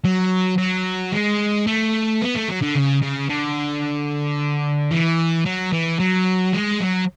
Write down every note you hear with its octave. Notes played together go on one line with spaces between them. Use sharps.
F#3
F#3
G#3
A3
B3
A3
F#3
D3
C#3
C#3
D3
E3
F#3
E3
F#3
G#3
F#3